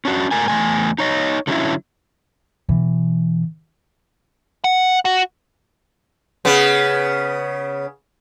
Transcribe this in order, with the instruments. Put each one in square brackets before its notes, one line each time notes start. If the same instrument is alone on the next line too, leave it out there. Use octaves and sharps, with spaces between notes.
[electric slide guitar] C#4 D4 F#4
G#2 A3 A#4 G#5
E2 C#3 A3 G#5
D#4 C#5 D#5
D3 F#3 C#4 D#4 E4
[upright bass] B2 E3
[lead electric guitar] F#5
F#4
[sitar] C#3 B3